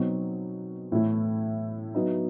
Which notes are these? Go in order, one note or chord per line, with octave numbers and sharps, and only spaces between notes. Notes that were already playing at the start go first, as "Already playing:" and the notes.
Already playing: B2 F#3 C4 D#4 F#4
A2 E3 A3 E4
F#3 B3 D#4 F#4